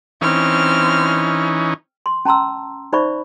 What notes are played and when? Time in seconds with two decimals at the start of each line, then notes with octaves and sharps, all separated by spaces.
0.22 E3 C4 C#4 D#4 F6
2.06 C6
2.25 C#4 A5 A#5 C6 E6
2.93 D#4 C5 D5 E5 B5 C#6